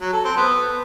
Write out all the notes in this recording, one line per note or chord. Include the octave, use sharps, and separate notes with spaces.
F#3
A4
C4
B3